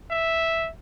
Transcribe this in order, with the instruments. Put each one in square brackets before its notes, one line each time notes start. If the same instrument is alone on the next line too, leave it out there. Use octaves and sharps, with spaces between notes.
[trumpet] E5